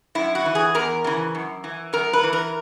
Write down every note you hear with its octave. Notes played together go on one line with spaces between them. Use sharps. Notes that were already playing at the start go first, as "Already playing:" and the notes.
F#2 E4
F#4
E3
G#4
E2 A#4
C#3 E3
F#2
E3
F#2 A#4
B4
E3
A#4